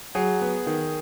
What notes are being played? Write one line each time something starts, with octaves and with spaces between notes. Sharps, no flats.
F#3 G#4
B3
D#3